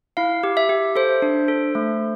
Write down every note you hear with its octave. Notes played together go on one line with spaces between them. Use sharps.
E4 F5
G4
E5
G4
A4 C5
D4
A4
A3